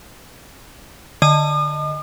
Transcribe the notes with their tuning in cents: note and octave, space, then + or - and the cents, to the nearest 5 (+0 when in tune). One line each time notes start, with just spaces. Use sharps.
D3 +15 D#5 +0 D#6 -45